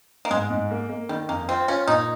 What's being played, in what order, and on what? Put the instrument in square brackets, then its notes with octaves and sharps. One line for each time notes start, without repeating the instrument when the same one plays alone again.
[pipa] A#3
[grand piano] G#2 [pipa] G#3
[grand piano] G#2
A#3
A#3
[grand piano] D#3 [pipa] G3
[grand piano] F2 [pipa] A#3
[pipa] C4 [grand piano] F4
[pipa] C#4 [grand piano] F4
[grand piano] A#2 [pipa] D#4